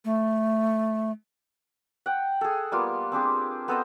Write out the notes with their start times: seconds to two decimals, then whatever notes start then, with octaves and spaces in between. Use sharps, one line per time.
0.05 A3
2.06 F#5 G5
2.41 G#4 A4
2.72 G3 A#3 B3 F4
3.12 C4 D4 G4 G#4
3.68 B3 A4 C5 D#5